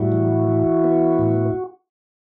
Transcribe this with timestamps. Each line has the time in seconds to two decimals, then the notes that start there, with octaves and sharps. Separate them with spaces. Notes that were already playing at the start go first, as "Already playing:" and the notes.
Already playing: A2 G3 E4 F#4
0.12 E3
0.48 E3
0.84 B3
1.19 A2